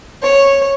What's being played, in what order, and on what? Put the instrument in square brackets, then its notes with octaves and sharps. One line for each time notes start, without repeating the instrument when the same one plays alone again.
[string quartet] C#5